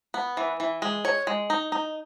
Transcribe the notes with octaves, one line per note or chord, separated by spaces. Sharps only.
B3
E3
E3
G#3
C#5
G#3
D#4
D#4